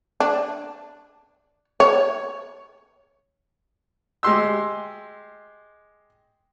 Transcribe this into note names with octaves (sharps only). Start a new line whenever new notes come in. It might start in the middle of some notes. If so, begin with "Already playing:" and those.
D4
C#5
G#3 G4 C6 E6